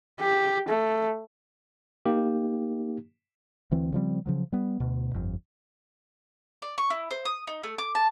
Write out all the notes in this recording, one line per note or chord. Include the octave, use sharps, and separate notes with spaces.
G4
A3
A#3 D#4 G4
D2 E3 C4
C#3 F3 G3 C4
C#3 F3 F#3
G3 B3
D2 B2
G1 F2
D5
C#6
E4
C5
D#6
D#4
A3
D6
A5